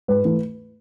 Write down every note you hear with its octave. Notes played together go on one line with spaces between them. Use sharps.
G#2 B4
E3 A3